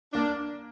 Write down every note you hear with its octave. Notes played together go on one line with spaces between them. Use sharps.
A#3 D4